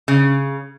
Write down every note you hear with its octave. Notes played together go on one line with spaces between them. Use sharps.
C#3